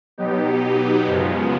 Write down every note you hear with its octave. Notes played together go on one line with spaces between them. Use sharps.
B2 F#3 B3 D#4 G4
F#2 C#3 F3 G#3 B3